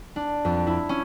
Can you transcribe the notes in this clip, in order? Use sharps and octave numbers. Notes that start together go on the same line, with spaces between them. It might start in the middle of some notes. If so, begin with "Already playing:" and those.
D4
F2
E4
C#4